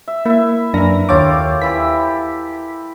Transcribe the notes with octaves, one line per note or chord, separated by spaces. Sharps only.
E5
A#3 E4 E5
F#2 E3 D4 A#4 A#6
D#2 F4 G4 A4 C#5 D6
E3 E4 G4 B6